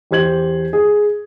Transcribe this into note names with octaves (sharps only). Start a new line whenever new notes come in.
E2 G4 C5 G#6 F#7
G#4